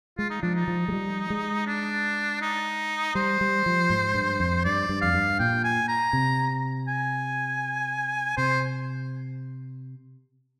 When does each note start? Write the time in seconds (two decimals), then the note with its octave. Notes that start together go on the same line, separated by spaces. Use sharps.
0.18 G#3 F4
0.30 D#4
0.42 F3 D4
0.55 D#4
0.68 F3
0.88 G#3
0.92 G3
1.30 G#3
1.67 D4
2.42 D#4
3.15 G3 C5
3.41 G3
3.66 F3
3.90 G#2
4.14 G2
4.40 F2
4.65 G2 D5
4.89 G2
5.01 F2 F5
5.14 G2
5.39 A#2 G5
5.64 G#5
5.89 A#5
6.13 C3
6.88 G#5
8.37 C3 C5